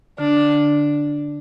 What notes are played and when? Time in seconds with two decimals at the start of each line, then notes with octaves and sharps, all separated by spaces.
0.18 D3 D4
0.37 D3